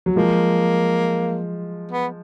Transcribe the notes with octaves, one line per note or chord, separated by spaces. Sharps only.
F#3
F3 G#3 A#3
B3